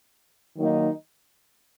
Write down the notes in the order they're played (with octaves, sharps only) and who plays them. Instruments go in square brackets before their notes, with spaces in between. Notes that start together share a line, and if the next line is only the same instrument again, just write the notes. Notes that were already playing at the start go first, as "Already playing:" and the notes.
[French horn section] D#3 F#3 A#3 D#4